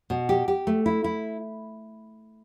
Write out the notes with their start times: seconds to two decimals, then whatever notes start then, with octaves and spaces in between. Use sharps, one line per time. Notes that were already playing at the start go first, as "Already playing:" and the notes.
0.10 B2
0.29 G4
0.48 G4
0.67 A3
0.86 E4
1.04 E4